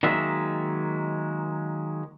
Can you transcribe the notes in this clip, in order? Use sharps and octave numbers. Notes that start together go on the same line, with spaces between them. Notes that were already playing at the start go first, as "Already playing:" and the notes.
D#3 F#3 G#3 A#3 E5